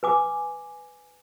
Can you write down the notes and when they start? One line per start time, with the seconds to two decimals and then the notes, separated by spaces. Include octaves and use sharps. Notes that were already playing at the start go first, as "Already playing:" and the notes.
0.03 B4 G#5 D6